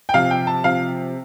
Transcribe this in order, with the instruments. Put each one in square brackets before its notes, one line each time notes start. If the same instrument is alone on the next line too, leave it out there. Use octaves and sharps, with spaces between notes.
[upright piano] G5
C3 F3 F5
G5
A5
C3 F3 F5